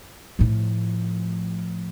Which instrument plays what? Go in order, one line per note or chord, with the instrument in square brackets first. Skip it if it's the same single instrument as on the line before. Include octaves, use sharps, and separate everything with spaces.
[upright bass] A2 F3